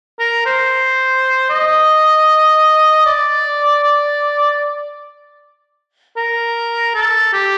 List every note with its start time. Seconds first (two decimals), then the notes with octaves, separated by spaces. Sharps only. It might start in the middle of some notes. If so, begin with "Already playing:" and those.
0.19 A#4
0.46 C5
1.50 D#5
3.06 D5
3.84 D5
6.17 A#4
6.95 A4
7.33 G4